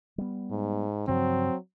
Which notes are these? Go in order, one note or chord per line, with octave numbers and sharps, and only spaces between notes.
G3 B3
G#2
G2 C#3 F3 F#3 C4